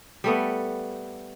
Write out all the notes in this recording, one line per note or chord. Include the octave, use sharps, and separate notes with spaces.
G3 A3 B3